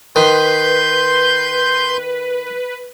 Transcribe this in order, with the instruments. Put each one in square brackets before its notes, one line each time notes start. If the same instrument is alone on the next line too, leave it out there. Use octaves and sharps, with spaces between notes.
[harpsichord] D#3 [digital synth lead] B4 [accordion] C6 G6